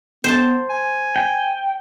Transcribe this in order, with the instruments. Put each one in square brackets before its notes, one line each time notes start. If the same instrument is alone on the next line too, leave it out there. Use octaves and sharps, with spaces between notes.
[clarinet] B3 [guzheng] C5 A5
[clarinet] G#5
[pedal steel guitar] G5